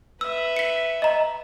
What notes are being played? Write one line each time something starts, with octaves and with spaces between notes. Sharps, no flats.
B4 E5 E6
B6 C#7
D#5 A#5